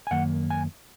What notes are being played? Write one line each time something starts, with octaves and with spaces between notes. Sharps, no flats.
G#5
F#2 D#3 A#3 F#5
G#5